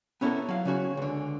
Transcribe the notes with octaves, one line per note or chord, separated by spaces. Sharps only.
B3 C#4 E4 F4 A4 A#4
F#3 F5
C#3 C#4 F#4 G#4
C#2 D3